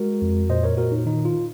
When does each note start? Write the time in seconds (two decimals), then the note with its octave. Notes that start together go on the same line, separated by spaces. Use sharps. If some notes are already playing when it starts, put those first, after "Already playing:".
Already playing: G#3 F#4 A#4
0.22 F2
0.50 A#2 C5 D#5
0.64 A#4 C#5
0.77 A#2 F#4 A#4
0.92 D#4
1.06 D#3 D#4
1.25 F4